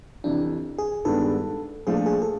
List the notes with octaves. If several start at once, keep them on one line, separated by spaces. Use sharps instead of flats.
F2 C3 E3 D4
G#4
G2 D#3 G#3 B3 D4 A4
A#2 F3 A3 D4 F4 G#4
A4
G#4
A4